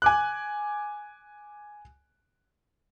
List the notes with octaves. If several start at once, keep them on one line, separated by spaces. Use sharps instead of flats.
G#5 D6 F#6